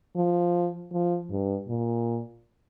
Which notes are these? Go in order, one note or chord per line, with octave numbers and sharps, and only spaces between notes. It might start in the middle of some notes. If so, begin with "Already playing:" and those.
F3
F3
G2
A#2